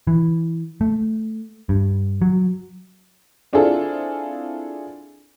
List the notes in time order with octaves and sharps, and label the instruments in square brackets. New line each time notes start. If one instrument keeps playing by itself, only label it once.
[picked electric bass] E3
A3
G2
F#3
[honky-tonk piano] C4 D4 E4 F4 G#4 A4